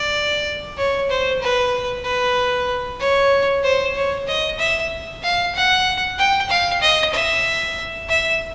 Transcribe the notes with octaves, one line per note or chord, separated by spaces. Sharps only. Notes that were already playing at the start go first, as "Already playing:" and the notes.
Already playing: D5
C#5
C5
B4
B4
C#5
C5
C#5
D#5
E5
F5
F#5
G5
F5
D#5
E5
E5